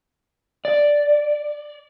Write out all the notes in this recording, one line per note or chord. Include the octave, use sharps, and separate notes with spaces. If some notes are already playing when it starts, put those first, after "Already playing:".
D5